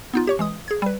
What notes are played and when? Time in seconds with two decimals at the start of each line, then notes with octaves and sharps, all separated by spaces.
0.14 B3 D#4 F4
0.27 G4 C#5 C#6
0.39 E3 G#3 D#6
0.68 G#4 G#6
0.82 G3 B4